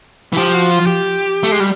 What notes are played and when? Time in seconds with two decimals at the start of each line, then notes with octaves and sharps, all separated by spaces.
0.33 E3
0.37 F3 G4
0.54 F#4
0.71 F4
0.87 G4
1.43 A3
1.52 G#3
1.60 G3